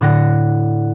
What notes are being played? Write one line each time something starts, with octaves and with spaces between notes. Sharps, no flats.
A2 D3 D4 F#5 A#6